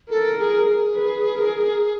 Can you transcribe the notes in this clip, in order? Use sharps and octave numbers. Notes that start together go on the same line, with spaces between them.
A4 A#4
G#4
G#4
B4
A#4